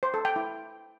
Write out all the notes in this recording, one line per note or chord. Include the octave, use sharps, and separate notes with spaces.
C5
A4
G5
E4